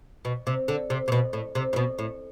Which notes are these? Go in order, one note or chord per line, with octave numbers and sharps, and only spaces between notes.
B2
C3
D3
C3
C3
B2
A2
C3
A2
B2
A2